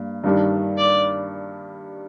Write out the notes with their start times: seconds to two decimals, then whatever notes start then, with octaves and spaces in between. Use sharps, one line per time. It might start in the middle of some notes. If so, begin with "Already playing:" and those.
Already playing: G2 A#3
0.24 G2 D#3 G3 D4
0.78 D5